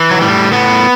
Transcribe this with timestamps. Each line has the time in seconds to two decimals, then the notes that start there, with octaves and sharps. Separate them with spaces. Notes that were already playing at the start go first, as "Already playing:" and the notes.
Already playing: E3
0.11 F#3
0.21 A2 G3
0.52 A2 B3